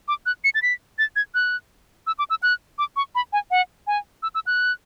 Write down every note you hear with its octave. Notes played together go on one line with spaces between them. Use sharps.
D6
F#6
C#7
A6
B6
A6
G#6
F#6
E6
D6
E6
F#6
D6
C#6
B5
G#5
F#5
G#5
E6
E6
F#6